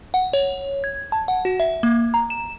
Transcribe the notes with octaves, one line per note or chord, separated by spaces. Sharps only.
F#5
C#5
G#6
A5
F#5
F#4
E5
A#3
A#5
E7